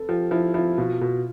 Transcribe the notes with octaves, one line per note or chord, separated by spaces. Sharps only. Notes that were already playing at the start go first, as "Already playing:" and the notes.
Already playing: A4 B4
F3 G4
F3 E4
F3 E4
B2 F4
B2